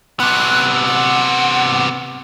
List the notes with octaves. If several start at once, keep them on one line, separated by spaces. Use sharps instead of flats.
C3 B3 F#6
F#5